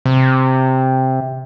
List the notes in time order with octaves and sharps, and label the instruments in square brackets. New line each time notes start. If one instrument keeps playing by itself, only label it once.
[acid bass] C3